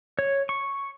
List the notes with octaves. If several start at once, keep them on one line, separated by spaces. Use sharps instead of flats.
C#5
C#6